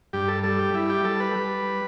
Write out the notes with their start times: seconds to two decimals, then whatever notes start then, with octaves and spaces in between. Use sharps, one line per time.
0.13 G2 G4
0.28 A4
0.43 G3 A4
0.59 G4
0.74 G3 E4
0.90 G4
1.04 G3 A4
1.20 B4
1.36 G3